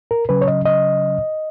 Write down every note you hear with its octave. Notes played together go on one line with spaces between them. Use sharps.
A#4
C#3 F#3 C#4 B4
C#5
D#5
D#5